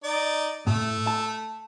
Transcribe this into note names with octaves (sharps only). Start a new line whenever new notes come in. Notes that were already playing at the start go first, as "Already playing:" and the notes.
D#4 D5
A2 A3
A5